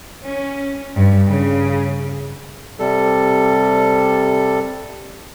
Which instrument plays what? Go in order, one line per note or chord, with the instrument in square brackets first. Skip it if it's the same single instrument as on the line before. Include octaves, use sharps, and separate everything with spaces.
[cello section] C#4
G2
C#3
[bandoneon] C3 G3 A4